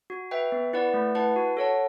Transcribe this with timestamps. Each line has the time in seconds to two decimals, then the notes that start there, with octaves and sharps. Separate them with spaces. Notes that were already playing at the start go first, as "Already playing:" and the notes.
0.10 F#4
0.31 B4 E5 G5
0.52 B3
0.73 E4 B4 D5 F#5
0.94 A3
1.15 E4 B4 F#5 A5
1.36 F#4
1.57 A4 C#5 F#5 A5